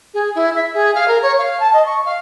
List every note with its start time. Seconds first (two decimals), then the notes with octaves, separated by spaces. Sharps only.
0.13 G#4
0.34 E4
0.55 E5
0.73 G#4
0.94 F5
1.07 A#4
1.22 C#5
1.38 F5
1.59 A5
1.73 D#5
1.85 C#6
2.05 F5